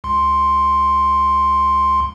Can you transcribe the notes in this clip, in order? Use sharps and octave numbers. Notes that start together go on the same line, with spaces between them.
C#2 C6